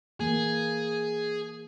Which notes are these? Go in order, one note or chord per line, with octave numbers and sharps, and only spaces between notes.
E3 A#3 G#4